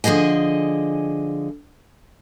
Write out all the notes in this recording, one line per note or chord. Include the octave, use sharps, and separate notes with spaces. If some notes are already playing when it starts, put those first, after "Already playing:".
D3 F3 G#4 D#5 G#5